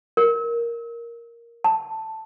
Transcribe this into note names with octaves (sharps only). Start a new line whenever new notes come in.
A#4
A5